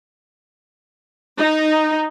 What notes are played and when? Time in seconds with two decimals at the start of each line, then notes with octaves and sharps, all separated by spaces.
1.38 D#4